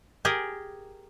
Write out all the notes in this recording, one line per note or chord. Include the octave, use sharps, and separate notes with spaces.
G4 G#4 A#4